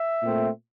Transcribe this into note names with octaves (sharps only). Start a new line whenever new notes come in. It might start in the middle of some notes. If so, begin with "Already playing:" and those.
Already playing: E5
A#2 A3 C4